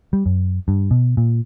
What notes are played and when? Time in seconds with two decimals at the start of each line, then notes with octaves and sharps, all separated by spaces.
0.13 G3
0.26 F#2
0.68 G2
0.91 B2
1.17 A#2